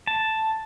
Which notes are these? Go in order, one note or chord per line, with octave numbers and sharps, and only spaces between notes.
A5